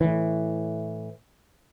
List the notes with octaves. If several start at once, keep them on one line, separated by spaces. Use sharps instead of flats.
A2 E3